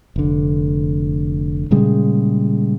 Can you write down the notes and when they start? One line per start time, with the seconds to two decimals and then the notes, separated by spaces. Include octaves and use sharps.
0.16 F1 D3
1.71 A#2 C#3 G3 G#3